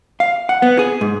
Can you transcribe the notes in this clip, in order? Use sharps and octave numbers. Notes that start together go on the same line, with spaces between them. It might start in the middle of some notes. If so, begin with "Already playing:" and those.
F5
F#5
B3
G#4
G#2